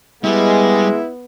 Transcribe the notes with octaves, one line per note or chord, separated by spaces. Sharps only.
G3 G#3 B3 E4